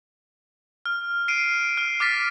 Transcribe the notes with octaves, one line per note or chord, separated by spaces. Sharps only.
F6
C7 D7 D#7
F6
D6 F6 A6 B6